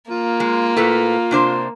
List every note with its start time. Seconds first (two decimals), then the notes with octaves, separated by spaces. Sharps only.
0.10 A#3 F4
0.40 G#3
0.77 A2 F4 A4 B4
1.31 C3 D4 C5